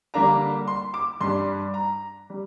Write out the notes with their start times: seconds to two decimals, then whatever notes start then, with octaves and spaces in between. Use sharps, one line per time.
0.14 D3 G3 A#3 D4 A#5
0.68 C6
0.94 D6
1.21 G2 G3 D4 C6
1.74 A#5
2.30 G3